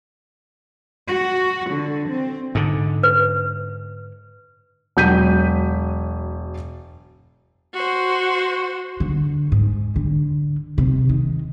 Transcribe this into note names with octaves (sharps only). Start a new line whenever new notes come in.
F#4
D3
C4
G#2 D3
B4
E1 F#3 G6 B6 D#7
F#4 C5
D3
G#2
D3
C3
D#3